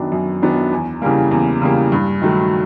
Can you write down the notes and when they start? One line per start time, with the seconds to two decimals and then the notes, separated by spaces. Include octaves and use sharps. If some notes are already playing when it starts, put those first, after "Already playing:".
Already playing: F#2 D#3 F#3 B3 D4
0.12 F#2
0.42 D#3 F#3 B3 D4
0.72 E2
1.02 C#3 E3 G3 A#3
1.31 E2
1.62 C#3 E3 G3 A#3
1.92 G2
2.21 D#3 F#3 A3